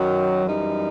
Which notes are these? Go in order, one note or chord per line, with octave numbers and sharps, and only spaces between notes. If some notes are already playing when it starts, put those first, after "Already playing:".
Already playing: F#2 D#3 F#3
F#2 E3 G3 D#4